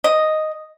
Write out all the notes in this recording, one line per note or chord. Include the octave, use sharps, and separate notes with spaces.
D#5